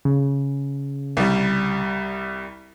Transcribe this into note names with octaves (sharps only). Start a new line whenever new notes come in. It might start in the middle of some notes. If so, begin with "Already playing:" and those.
C#3
C2 G3